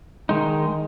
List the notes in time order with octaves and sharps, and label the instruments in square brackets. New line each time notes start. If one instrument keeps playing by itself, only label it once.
[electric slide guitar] D#3 G#3 D#4